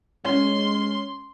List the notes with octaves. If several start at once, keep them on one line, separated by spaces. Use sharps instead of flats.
G#3 C#4 C6